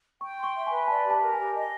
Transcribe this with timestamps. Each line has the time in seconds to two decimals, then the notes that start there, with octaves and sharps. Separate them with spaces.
0.21 G5 C#6
0.38 C6
0.43 C#6
0.55 E5
0.66 B4 G#5
0.88 D5 A5
1.04 G4
1.10 A5
1.22 A#4
1.33 G#5
1.38 G4
1.55 D#5